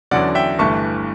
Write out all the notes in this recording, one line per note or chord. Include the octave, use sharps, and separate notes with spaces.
E2 D3 F#3 C#4 D5 F#5
E5 G5
G1 G2 E3 A3 A5 C#6